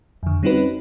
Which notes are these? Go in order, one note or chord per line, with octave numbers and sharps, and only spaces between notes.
F2 D3
G3 C4 C#4 D#4 F#4 B4